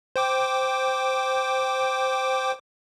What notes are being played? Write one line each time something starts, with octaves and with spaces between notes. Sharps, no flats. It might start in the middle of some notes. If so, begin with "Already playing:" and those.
C5 G5 D6